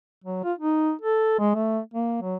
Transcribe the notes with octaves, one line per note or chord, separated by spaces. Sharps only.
F#3
F4
D#4
A4
G#3
A3
A#3
F#3